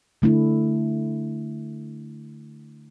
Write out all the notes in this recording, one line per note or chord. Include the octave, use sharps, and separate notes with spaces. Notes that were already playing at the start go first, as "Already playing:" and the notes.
D3 A3 D4 E4